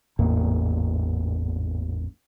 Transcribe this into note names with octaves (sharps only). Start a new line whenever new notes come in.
G#1 E2 A2 A#3